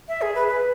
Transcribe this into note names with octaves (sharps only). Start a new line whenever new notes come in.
E5
G#4
B4
B4